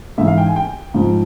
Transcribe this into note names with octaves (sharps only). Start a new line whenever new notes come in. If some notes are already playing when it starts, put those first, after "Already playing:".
G#2 E3 E5
F5
G5
G#5
G5
G#2 F3